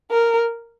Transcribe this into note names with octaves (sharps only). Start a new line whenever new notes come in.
A#4